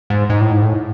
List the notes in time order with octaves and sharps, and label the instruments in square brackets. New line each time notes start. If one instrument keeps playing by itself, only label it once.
[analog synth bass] G#2
G#2
A2
G#2
A2